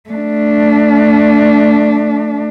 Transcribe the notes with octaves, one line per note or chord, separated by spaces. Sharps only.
A3 D4